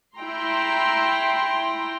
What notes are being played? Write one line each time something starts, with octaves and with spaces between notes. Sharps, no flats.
E4 G5 A#5 C6